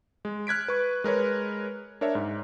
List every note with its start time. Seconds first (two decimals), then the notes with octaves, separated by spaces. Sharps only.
0.25 G#3
0.47 F6 F#6 G#6 B6 D7
0.68 B4 C#6
1.04 G#3 A#4 B4 C#5
2.01 D4 A#4 C#5 E5
2.15 G#2